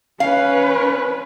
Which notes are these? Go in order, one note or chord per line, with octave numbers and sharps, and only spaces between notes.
C#4 B4 F5